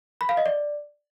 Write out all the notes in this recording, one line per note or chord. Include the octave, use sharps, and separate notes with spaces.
B5
F5
D#5
D5